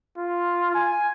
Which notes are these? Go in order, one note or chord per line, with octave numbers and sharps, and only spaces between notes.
F4
G#5